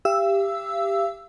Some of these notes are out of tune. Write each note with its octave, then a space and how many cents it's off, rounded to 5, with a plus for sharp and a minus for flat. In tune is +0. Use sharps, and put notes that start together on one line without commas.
G4 +10 F5 -45 E6 +0